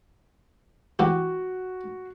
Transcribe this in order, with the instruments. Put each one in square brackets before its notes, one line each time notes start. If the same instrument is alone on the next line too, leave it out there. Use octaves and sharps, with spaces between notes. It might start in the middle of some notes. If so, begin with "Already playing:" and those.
[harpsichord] E3 G4 [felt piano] F#4